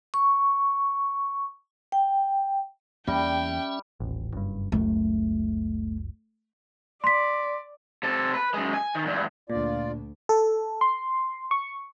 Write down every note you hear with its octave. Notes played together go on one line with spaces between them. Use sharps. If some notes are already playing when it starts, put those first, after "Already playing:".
C#6
G5
E2 G3 A#3 C#4 E5 G5
D#1 A1
F#1 G2
F#1 C#2 F#2 A3
D5 C6 B6
C3 A4
B4
F#2 G#3
G#5
D#3
E2 G2
D2 A#2 D4 F4 D5
A4
C6
C#6